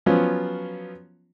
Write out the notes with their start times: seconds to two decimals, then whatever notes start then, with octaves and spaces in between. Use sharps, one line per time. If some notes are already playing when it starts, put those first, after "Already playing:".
0.06 F3 F#3 B3 C#4 F4